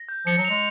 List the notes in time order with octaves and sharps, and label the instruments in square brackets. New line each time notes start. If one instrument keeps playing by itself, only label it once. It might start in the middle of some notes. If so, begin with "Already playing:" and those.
Already playing: [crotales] A#6
G6
[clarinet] F3 [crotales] C#7
[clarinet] F#3
[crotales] F7
[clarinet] G#3